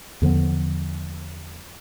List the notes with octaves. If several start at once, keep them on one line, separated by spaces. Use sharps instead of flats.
E2 D3 F3 B3